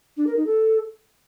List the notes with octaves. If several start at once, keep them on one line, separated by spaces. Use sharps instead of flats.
D4
A#4
D#4
A4